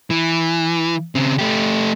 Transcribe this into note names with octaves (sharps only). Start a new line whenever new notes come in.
E3
C#3 C4
A3 G4